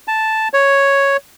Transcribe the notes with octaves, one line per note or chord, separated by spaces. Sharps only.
A5
C#5